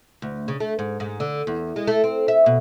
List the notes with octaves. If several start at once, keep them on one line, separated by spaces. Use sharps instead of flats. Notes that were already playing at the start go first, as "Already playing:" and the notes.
D2
C#3
A3
G#2
G#2
D3
E2
G#3
A3
C4
E5
B2